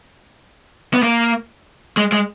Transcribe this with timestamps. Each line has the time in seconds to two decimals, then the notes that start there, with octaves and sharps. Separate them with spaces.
0.94 B3
1.03 A#3
1.97 G#3
2.12 G#3